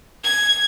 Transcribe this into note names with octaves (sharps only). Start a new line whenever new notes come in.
G#6